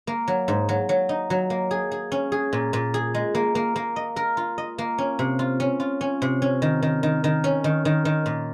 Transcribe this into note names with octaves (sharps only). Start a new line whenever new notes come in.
A#3
F#3
G#2
F#3
F#3
D#4
F#3
A#3
G#4
G#4
C#4
G#4
A#2
A#2
G#4
G#3
A#3
A#3
A#3
D#5
A#4
F4
D#5
A#3
C#4
C3
F4
C#4
F4
C#4
C3
C#4
D#3
D#3
D#3
D#3
C#4
D#3
D#3
D#3
A#2